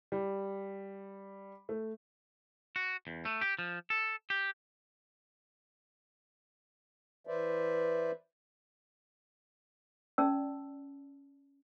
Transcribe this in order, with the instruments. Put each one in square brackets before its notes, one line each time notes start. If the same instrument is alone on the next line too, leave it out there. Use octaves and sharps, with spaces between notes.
[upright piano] G3
A3
[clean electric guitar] F#4
E2
A3
G4
F3
A4
G4
[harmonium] E3 B4 C5 D5 E5
[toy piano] C#4 D5 A5 E6